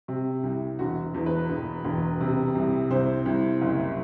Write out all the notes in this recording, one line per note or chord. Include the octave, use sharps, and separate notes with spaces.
C3
C2
E1 F#4
E2
B4
E1
E1
C3
C2
C2 C5
C2
F#1